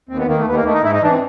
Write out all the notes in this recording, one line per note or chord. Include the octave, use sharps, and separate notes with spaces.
D#2 C4
B3
D#3 A#3
A3
D#2 B3
A#3
D#3 A3
D#4
G#2 E4
D#4
E3 D4
C4